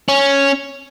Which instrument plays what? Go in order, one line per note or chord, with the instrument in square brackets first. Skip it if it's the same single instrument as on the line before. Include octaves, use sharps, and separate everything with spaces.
[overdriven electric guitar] C#4